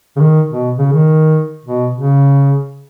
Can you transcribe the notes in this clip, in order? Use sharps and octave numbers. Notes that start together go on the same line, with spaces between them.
C#3
D#3
B2
C#3
D#3
B2
C#3